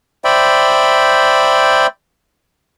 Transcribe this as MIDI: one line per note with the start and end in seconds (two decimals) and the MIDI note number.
0.24 1.87 72
0.24 1.87 74
0.24 1.87 76
0.24 1.87 79
0.24 1.87 83